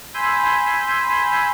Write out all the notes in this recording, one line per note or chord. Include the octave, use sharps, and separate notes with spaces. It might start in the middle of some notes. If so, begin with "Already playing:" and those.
G#5 B5 C6 E6 G6